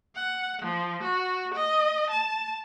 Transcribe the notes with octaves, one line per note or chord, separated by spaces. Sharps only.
F#5
F3
F#4
D#5
A5